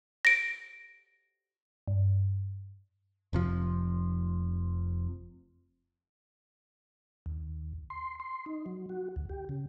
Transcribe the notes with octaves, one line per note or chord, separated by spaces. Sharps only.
A#6 D7
G2
F1 C3 F3
D#2
C6
C6
D#4
F#3
F#4
D2
G4
C#3